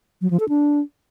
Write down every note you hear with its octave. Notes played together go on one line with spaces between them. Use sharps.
F#3
F3
A4
D4